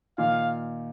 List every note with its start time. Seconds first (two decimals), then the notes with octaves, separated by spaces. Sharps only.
0.18 A#2 D#3 F5